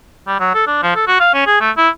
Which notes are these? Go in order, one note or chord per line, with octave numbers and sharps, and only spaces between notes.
G3
F#3
A4
D4
F3
A4
F#4
F5
C#4
G#4
A3
E4